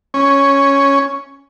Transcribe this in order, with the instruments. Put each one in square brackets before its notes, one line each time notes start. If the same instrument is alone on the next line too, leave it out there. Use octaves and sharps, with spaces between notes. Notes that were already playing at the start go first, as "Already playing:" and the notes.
[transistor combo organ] C#4